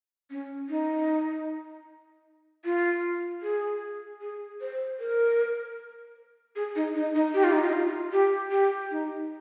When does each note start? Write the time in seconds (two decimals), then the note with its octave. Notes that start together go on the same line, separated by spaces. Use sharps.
0.31 C#4
0.69 D#4
2.65 F4
3.43 G#4
4.21 G#4
4.61 C5
5.00 A#4
6.56 G#4
6.76 D#4
6.95 D#4
7.15 D#4
7.34 G4
7.44 F4
7.53 D#4
7.62 F4
7.69 D#4
7.73 F4
8.12 G4
8.51 G4
8.91 D#4